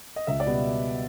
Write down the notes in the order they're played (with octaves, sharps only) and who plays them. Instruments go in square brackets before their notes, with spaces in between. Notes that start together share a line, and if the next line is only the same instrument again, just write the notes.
[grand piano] D#5
C#2 E5
D5
B2 G3 B3